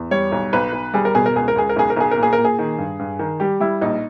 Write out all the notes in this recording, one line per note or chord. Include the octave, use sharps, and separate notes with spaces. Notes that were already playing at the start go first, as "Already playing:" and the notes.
Already playing: E2
G3 C#5
B1
B1 B4
B1
G3 G#4
A#4
B2 G#4
A#4
C#2 G#4
A#4
C#2 G#4
A#4
B1 G#4
A#4
B1 G#4
A#4
A#2
G#4
A#4
A#2
G#4
D#3
G2
G2
D#3
G3 G4
G3 E4
A#1 D#4